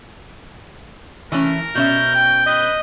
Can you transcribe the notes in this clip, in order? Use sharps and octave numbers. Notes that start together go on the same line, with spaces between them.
E3 A3 C#4 A#4
B2 C#4 E5 G6
G5
B4 D#5